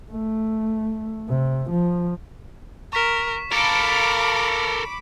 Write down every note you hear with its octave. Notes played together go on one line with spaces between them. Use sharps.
A3
C3
F3
A#4 C#6 B6 E7
A4 A#4 F5 B5 D6 C#7 D7